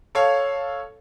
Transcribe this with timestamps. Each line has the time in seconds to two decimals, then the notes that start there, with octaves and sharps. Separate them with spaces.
0.15 A4 C#5 F5